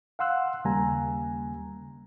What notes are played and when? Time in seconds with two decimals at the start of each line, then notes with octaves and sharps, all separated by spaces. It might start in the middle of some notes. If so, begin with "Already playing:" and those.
0.19 F5 F#5 C6 E6 F#6
0.65 D#2 C#3 G3 A#3 G#5 A#5